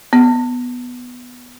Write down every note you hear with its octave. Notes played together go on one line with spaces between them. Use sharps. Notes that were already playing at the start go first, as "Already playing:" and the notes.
B3